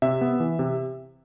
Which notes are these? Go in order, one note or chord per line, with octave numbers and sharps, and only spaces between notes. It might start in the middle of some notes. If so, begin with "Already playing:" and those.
C3 E5
B3
E3
C3